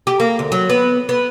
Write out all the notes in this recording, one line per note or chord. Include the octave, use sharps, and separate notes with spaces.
G4
A#3
D2
F#3
B3
B3